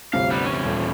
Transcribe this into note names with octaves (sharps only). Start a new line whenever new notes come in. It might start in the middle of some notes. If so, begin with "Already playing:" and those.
G1 D2 C3 F5
G3 B3
E2 C#4
D#1